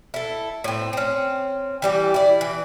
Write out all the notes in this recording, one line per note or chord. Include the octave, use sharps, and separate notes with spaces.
E4 A4
A2 C4
C4 C#4
E3 G3 G4
E4 D5
E3